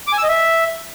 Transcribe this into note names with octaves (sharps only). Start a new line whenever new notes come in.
D6
G#5
E6
D#5
E5